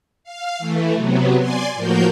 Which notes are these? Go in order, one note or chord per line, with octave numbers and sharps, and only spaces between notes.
F5
E3 A3
C3 F#3 B3
D5 G#5 C6
A2 F3 A#3 F#4 A#4 G6